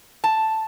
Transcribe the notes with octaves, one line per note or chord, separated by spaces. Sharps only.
A5